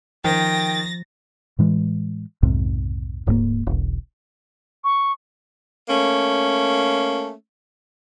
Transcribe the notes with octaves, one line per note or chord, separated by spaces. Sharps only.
D#3 F3 G5 A6 A#6
A2 E3 G#3
B1 F2 G#2 C3
D1 G#2 G3 A#3
E1 B1
C#6
A3 A#3 C#4